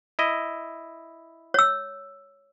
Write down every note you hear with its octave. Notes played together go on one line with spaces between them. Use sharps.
E4 D#5
C#5 E6